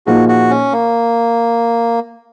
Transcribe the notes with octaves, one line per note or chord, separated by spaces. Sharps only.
A#2 F3 A#3 D#4 F#4 G#4
F#4
C#4
A#3